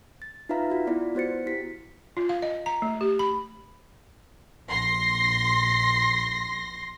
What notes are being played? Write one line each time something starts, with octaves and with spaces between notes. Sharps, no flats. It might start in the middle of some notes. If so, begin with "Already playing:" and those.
A6
D#4 F4 B4 E5 F5 A#5
F4 F#4
B3 E4 F4 D5
B3 F#4 C5 A6 C#7
E4 G4 B6 C7
F4
F5
D#5
A#5
A3
G4
B5
A#1 C6 A#6